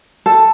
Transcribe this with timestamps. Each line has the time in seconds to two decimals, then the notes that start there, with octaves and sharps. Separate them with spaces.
0.26 A4